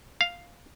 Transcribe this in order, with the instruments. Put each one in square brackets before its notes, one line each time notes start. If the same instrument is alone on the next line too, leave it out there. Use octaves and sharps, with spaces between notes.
[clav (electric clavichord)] F5